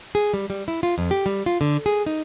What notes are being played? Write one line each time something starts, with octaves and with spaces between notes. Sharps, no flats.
G#4
G3
G3
E4
F4
F2
G4
G3
F4
D3
G#4
D#4